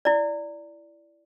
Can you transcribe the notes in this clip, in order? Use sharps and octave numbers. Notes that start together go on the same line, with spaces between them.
E4 D5